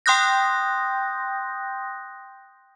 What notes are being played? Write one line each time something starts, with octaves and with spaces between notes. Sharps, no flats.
G5 C6 D#6 F#6 G6 A#6